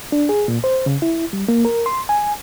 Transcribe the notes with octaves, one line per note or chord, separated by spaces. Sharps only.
D4
G#4
A#2
C5
C#3
E4
G3
A#3
A#4
C6
G#5